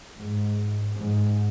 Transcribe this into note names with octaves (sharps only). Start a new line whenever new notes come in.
G#2
G#2